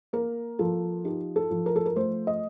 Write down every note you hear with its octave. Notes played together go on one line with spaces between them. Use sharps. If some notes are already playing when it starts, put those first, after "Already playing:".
A#3 A#4
F3 A4
D#4 G4
A4
F3
A#4
A4
A#4
A3 C5
D#5